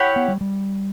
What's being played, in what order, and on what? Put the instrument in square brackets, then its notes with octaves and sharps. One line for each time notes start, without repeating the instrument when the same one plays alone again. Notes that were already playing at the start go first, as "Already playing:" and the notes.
Already playing: [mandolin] E4 G4 C#5 F#5
[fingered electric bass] B3
G3
G3